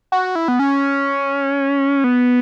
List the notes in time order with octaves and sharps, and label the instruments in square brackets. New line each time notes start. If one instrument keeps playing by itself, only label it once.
[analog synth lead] F#4
E4
B3
C#4
B3